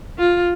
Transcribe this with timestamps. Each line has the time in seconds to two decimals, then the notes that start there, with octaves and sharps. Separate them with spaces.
0.18 F4